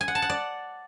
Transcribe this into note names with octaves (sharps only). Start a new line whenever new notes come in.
G#5
F#5
A5
F#5
D5